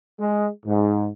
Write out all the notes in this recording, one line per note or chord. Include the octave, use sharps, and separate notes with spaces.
G#3
G#2